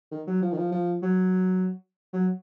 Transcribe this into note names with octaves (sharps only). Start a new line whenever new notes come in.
D#3
F#3
F3
D#3
F3
F3
F#3
F#3